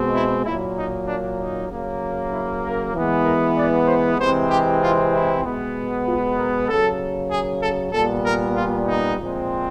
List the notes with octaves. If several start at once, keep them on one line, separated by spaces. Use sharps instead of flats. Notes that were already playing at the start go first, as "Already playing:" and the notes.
Already playing: B2 G#3 C4
E4
A#2 F#3 A#3 E4
D#4
D4
D#4
C#3 F#3 A#3
E4
A#4
E3 G#3 B3
A#4
D5
C5
C3 E3 G#3 C4 C5
G4
F4
E4
B2 G#3 B3
F4
A#4
C#3 F#3 A#3 A4
G#4
A4
A#2 G3 B3 A4
A#4
F4
D#4
A#2 F3 G#3 C4